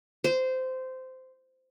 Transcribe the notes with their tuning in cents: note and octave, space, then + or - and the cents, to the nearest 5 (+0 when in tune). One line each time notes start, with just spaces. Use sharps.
C5 -15